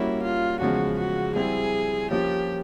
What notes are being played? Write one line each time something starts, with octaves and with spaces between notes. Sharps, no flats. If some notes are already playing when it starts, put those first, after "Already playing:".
Already playing: G3 A#3 C#4 E4 F#4
F4
E2 C#3 F3 G#3 F#4
F#4
G3 C4 E4 G#4
F3 A#3 C#4 F4 G4